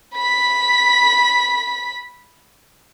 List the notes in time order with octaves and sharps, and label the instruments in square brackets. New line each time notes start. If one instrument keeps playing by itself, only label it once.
[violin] B5 B6